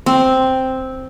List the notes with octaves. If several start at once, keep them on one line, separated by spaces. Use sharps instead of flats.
C4